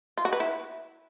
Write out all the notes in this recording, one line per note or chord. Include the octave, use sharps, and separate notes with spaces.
F4
F#4
B4
E4